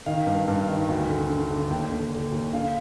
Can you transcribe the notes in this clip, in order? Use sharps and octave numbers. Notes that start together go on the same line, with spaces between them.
D#3 F5
G2
G2
D#3
D2
D3
D3
D3
D#2 G5
D3
D3
D#2
D3 F5